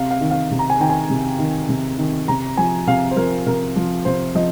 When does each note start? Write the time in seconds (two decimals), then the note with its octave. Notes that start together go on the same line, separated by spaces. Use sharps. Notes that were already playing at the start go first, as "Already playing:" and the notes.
Already playing: C3 F5
0.11 F5
0.21 D#3
0.31 F5
0.51 C3
0.59 A#5
0.70 G#5
0.80 D#3 G5
0.90 G#5
1.10 C3
1.39 D#3
1.69 C3
1.98 D#3
2.28 C3 A#5
2.57 F3 G#5
2.87 C3 F5
3.11 C5
3.16 F3 A#4
3.46 C3 A#4
3.76 F3
4.05 C3 C5
4.35 F3 D#5